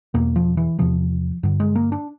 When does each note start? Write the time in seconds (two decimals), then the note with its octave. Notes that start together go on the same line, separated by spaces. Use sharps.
0.14 E2 B2 A#3
0.36 F3
0.57 E3
0.79 E2 C3 F3
1.43 G2 D3
1.60 G#3
1.75 A#3
1.92 D4